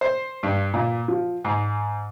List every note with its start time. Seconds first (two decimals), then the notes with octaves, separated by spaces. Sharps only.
0.01 C5
0.43 G2
0.74 A#2
1.08 F3
1.44 G#2